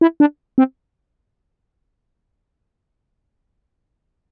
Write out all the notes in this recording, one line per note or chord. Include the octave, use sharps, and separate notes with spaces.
E4
D4
C4